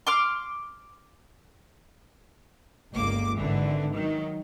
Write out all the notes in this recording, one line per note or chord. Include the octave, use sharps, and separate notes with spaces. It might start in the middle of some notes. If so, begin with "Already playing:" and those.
C6 D6 F6
G1 C#2 A#3 D6
G#1 D3 E3
D#3 F#3